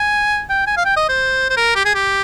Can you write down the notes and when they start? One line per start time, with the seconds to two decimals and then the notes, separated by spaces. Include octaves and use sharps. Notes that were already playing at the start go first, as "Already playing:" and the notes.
Already playing: G#5
0.49 G5
0.67 G#5
0.77 F5
0.85 G5
0.96 D#5
1.09 C5
1.50 C5
1.57 A#4
1.75 G4
1.85 G#4
1.95 G4